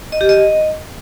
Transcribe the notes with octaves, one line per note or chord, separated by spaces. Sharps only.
D#5
G4
D#5